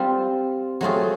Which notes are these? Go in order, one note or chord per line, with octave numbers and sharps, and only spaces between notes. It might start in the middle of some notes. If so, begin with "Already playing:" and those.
Already playing: G3 C4 F4
F#3 A3 C4 F4 G#4